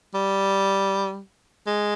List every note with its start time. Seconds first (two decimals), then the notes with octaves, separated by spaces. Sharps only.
0.14 G3
1.67 G#3